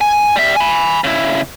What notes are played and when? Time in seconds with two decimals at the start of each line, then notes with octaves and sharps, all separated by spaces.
0.01 G#5
0.36 G3 E5
0.56 G#5 B5
1.04 C#3 E4